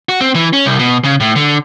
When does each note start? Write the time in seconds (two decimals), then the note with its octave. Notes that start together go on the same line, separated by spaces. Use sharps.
0.09 F#4
0.21 C4
0.35 E3
0.53 C#4
0.66 C2
0.79 B2
1.04 C#3
1.20 A2
1.36 D3